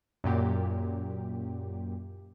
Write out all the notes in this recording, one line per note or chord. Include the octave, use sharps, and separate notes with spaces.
F#2 A#2 G4